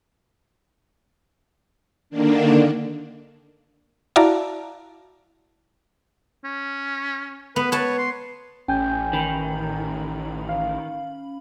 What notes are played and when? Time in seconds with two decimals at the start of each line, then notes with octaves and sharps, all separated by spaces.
2.10 D3 D#3 A#3 D4
4.16 E4 F#4 D5 F5 A5 A#5
6.44 C#4
7.56 B3 B4
7.72 B4 C#5 A5
7.99 C6
8.68 A1 C#4 G5 G#5 G6
9.13 D#3 C#4 B5
10.49 F5